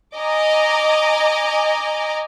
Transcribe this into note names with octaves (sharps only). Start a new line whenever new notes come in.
D#5 G#5 A#5 D6